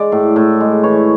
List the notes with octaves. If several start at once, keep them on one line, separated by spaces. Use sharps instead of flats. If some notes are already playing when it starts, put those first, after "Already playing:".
Already playing: G#3 D5
A2
A2
G#3
E3 C#5